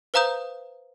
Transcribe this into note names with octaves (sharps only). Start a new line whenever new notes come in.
B4 C5 F5 A#5 D#6 G6